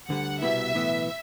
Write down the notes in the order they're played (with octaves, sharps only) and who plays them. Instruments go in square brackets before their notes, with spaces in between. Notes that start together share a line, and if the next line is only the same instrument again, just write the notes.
[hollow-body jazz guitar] D2 D3 G3 [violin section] F#5
[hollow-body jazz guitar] C2 B2 G3 B3 E4 [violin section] E5
[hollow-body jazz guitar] B1 A2 E3 B3